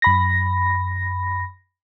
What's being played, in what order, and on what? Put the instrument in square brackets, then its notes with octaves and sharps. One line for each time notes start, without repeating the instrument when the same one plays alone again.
[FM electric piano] F#2 B5 A#6